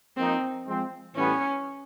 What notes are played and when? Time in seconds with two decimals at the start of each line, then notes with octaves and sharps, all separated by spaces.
0.16 F3 A#3 C4 D#4
0.66 F3 G#3 C4
1.15 A2 E3 G3 B3 C#4